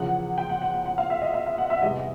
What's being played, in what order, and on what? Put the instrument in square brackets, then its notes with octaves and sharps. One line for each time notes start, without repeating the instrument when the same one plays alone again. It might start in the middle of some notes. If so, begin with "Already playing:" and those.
Already playing: [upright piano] E2 C#3 F3 [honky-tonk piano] F#5
[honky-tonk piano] G5
F#5
F#5
F#5
F#5
F5
E5
D#5
E5
F5
F#5
E5
[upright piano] E2 C3 E3 G3 [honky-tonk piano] D#5